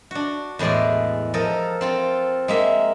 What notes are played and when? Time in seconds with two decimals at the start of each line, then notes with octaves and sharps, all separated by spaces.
0.11 D4 F#4
0.59 E2 A2 G#3 D5 G#5
1.34 F3 A4 A#4 D#5
1.81 C4 F4 A4
2.48 G#3 A#3 E5